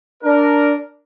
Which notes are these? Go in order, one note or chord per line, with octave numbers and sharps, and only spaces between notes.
D4 A#4